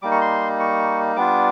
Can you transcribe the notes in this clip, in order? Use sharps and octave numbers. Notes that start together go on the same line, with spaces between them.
G3 A#3 D#4 D6
C#6
C6
C#6
G3 B3 D4 F4 D6